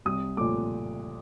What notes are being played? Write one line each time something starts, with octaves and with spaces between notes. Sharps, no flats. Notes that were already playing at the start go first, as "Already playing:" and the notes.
C2 D#6
A#2 F3 A3 D6